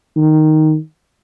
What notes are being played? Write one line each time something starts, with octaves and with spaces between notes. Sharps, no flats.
D#3